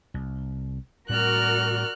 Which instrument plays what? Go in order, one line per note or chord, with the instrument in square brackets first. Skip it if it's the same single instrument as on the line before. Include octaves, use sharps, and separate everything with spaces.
[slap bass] C2
[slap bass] A2 G3 C4 [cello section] F#4 A#4 D5 [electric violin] F6 F#6